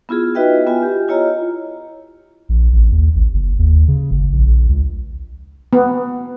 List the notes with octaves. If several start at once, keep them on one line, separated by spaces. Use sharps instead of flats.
B3 E4 F4 G#4
D#4 F#4 B4 D#5 E5 G5
B3 F4 G#5
G4
E4 F4 C#5 D#5 A#5
A#1
A1
D#2
A1
F#1
D#2
C#3
F#1
A#1
C#2
B3